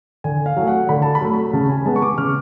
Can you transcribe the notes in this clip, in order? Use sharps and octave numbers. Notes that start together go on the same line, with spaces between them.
D3 G#5
F5
F#3 A3
F#5
D3 B5
A5
B5
F#3 A3
C#3 A5
G#5
G#3 B3 A5
C#6
D6
C#3 F6